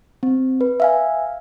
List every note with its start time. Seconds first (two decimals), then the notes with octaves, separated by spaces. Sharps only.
0.23 C4
0.61 B4
0.80 E5 F5 G#5